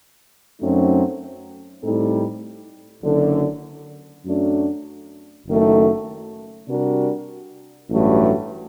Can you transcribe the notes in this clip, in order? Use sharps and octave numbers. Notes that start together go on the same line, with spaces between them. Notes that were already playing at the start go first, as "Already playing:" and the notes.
F#2 F#3 A3 C4 D#4
A2 G3 C4 D#4 A4
F#1 F#2 D3
F#2 F#3 A3 D4
F#1 F#2 D#3 A3
C3 G3 D4 F#4 A#4
A1 G2 F#3 A3